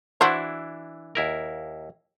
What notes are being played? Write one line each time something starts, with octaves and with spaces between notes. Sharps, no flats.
E3 D4 E4 F#4 C5
D#2 E4 A#4